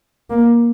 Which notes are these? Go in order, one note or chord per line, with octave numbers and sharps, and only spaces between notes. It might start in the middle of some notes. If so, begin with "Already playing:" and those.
A#3